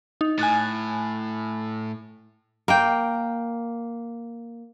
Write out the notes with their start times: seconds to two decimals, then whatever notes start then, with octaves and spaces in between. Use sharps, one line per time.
0.21 D#4
0.39 A2 G#5 F#6 A6
2.68 A#3 G5